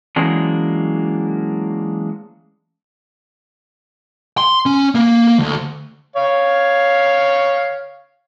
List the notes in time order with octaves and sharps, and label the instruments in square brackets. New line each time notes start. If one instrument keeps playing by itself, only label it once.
[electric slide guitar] E3 F#3 G#3 A#3 C#4 D4
[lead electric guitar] C6
C#4
A#3
D2
[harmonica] C#5 F5